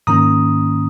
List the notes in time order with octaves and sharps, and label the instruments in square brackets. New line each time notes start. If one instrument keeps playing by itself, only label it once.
[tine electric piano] G#2 D#3 A#3 C#4 A#5 D#6